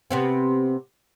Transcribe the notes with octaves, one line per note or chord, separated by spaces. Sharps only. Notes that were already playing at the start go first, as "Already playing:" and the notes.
C3 B3 C4